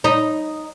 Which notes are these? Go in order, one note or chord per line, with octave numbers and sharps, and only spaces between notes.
D#4